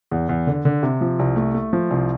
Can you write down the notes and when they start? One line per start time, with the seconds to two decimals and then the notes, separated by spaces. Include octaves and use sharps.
0.11 E2
0.29 E2
0.47 D3
0.65 D3
0.83 C3
1.01 F3
1.19 C2
1.36 A3
1.54 A3
1.73 F3
1.90 C2